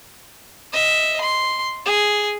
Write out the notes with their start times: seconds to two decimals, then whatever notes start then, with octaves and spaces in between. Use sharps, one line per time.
0.73 D#5 E5
1.21 C6
1.85 G#4